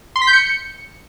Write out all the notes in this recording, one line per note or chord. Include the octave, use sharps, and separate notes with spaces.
C6
B6
G6
C#7